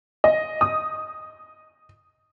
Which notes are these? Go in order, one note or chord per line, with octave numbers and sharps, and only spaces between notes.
D#5
D#6